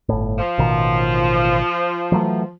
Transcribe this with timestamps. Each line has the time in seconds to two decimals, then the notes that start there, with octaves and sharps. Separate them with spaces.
0.09 G1 A2
0.39 F3
0.58 A1 B2 D#3
2.12 E3 F#3 A3